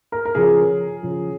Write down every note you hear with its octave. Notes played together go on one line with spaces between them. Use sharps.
A#4
A#4
C#3 F3 G#4
C#3 F3